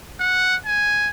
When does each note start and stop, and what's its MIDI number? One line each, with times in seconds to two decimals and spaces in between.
0.20 0.56 78
0.66 1.10 80